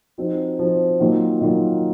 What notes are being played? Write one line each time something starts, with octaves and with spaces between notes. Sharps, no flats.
F3 C4 D#4 F#4
F3 C4 D#4 F#4
D#3 F#3 A#3 F4
D#3 F#3 A#3 F4